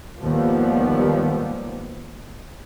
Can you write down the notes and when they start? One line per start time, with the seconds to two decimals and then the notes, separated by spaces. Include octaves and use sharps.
0.19 D#2 G#2 D#3 F3 G3 B3